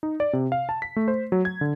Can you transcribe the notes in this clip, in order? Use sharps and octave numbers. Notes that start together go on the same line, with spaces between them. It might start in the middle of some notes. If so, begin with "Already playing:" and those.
D#4
D5
C3
F5
A5
B6
A3
C5
F#3
G#6
D3